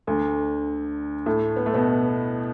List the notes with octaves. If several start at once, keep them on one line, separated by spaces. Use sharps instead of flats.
D2 D3
A2 A3
B3
A3
B2 B3